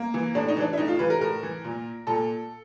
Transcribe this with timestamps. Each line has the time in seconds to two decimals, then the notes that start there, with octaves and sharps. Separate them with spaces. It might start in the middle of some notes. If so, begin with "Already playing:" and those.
Already playing: A#3
0.14 E3
0.35 A2 D4
0.48 D#4
0.56 E3 D4
0.73 E4
0.78 A2 D#4
0.88 F4
0.99 E3 B4
1.10 A#4
1.21 A2 A#4
1.43 E3
1.64 A#2
2.07 A#2 A4